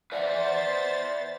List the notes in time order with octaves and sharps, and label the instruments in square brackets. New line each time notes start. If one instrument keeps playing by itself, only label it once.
[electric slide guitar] B4 E5 F#5 [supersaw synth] C5 A6 [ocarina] D5